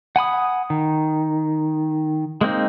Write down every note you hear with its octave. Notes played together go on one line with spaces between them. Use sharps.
F#5 G#5 B5 D#6
D#3
G#3 A#3 C4 D#4